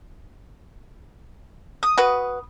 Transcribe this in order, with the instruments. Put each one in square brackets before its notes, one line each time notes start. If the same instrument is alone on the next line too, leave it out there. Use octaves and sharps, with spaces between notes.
[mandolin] D#6
[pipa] F#4 B4